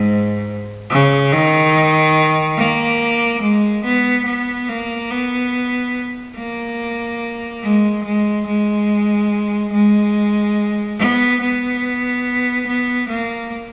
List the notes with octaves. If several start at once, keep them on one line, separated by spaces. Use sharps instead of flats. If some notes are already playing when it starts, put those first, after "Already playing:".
Already playing: G#2
C#3
D#3
A#3
G#3
B3
B3
A#3
B3
A#3
G#3
G#3
G#3
G#3
B3
B3
B3
A#3